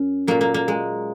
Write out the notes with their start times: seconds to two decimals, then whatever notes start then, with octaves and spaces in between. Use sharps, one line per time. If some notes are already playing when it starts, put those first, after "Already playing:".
Already playing: F#2 C#4
0.27 A#2 F#3 A#3
0.41 A#3
0.54 A#3
0.68 G#3